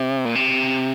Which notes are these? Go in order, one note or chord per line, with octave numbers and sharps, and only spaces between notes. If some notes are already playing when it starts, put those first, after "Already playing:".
Already playing: C3
A#2
C3